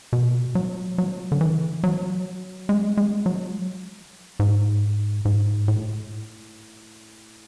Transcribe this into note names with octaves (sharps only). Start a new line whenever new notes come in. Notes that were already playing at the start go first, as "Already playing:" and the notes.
B2
F#3
F#3
D3
E3
F#3
G#3
G#3
F#3
G#2
G#2
A2